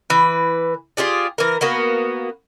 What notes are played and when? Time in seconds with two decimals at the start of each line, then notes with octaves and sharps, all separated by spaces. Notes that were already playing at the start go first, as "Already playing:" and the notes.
0.10 E3 B4
0.97 F4 G4 G#4 D5
1.38 E3 A#4
1.61 A#3 B3 F#4